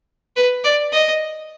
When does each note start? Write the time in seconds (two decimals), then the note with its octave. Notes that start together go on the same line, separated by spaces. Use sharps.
0.36 B4
0.64 D5
0.93 D#5